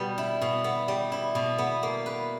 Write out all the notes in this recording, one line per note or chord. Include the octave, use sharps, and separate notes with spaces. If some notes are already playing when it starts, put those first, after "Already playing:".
Already playing: B2 G3 B3
E4
B2
B3
G3
E4
B2
B3
A#3
B4